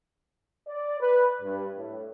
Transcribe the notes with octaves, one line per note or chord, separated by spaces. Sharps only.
D5
B4
G2
A2